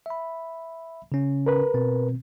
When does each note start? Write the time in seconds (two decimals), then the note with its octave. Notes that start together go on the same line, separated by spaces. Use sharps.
0.06 E5 B5
1.12 C#3 C#4
1.46 A#4 B4
1.74 B2 C4